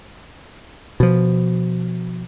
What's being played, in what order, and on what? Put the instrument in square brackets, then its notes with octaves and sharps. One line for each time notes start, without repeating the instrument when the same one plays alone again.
[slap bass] B2 F3